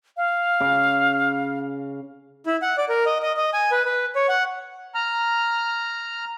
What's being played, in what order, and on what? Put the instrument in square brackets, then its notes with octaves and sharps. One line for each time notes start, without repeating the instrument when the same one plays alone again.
[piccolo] F5
[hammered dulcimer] C#3 D6
[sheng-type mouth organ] E4
F#5
D5
A#4
D#5
D#5
D#5
G#5
B4
B4
C#5
F#5
A#5 F6